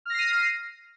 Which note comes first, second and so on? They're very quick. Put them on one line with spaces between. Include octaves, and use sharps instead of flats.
F6 A#6 C7 D#7